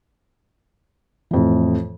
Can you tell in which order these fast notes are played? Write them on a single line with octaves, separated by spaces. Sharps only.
E3 F2 A2